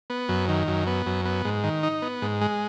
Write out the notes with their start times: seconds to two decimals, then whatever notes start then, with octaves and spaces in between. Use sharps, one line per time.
0.10 B3
0.29 F#2
0.48 D#3
0.67 F#2
0.87 B3
1.06 F#2
1.25 B3
1.45 G#2
1.64 D#3
1.83 D#4
2.02 B3
2.22 G#2
2.41 G#3